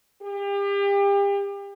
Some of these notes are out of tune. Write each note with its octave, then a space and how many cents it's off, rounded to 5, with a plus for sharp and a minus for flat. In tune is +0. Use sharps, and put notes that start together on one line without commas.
G4 +35